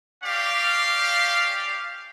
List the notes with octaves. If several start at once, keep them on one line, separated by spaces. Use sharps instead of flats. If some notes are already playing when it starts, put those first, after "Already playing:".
C#4 G4 D5 F5